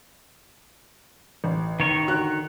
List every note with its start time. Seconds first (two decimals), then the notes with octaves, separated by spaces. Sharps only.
1.44 A1
1.80 D#3 C#5
2.08 D3 F#4 F#6